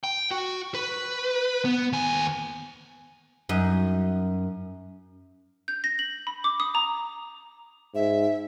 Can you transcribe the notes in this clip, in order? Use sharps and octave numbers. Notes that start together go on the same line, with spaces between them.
G5
F#4
B4
B3
D#2 G#5
F#2 D#4
G6
A#6
F#7
B5
D6
D#6
A#5
G#2 E5